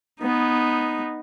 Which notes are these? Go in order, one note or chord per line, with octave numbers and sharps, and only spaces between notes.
B3 D#4